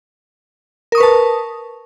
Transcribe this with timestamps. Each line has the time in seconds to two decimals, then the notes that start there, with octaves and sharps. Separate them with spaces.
0.92 A#4
0.95 D#6
0.98 C#6
1.00 B4
1.03 A5